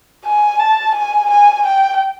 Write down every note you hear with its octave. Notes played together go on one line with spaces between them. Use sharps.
G#5
A5
G#5
G#5
G5